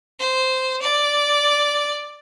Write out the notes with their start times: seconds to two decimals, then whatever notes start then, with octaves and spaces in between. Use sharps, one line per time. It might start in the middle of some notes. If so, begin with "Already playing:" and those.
0.20 C5
0.82 D5